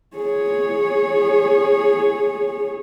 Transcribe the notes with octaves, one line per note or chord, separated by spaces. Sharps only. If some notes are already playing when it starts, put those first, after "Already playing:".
G#4 C#5